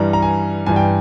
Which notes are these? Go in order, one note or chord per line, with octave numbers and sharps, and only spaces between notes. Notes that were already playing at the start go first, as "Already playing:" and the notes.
Already playing: G2 E3 G3 A#5
A#5
G#5
G2 E3 G3 G#5
G5